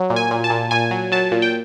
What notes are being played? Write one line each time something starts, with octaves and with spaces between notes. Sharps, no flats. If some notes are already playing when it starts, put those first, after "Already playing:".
Already playing: F#3
A#2
G#5
A#2
A5
A#2
A#2 G#5
F#3
F#3 A5
A#2
G5